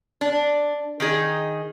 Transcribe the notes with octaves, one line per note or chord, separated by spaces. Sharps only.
D4
D#3 D#4 G#4